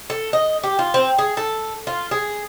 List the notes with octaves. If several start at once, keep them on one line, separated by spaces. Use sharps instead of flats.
A4
D#5
G4
F4
C4
G#4
A4
F4
G#4